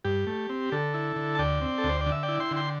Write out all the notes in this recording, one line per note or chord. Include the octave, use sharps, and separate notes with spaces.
G2 G4
A3
C4
D3 A4
E4
D3
A5
D2 D5 G5
C4
A4
D2
C5
D5
D3
E5
D5 G5
E4
G5 C6
D3
G5 C6